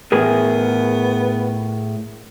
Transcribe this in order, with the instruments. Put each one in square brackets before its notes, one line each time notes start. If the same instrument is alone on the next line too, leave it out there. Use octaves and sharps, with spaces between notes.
[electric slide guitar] A2 G#4 A#4 [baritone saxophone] B3